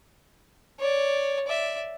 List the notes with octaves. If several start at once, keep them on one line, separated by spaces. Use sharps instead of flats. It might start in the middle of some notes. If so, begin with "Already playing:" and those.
C#5 D5
D5 E5